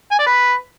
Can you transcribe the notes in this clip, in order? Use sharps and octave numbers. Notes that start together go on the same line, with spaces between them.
G#5
D5
B4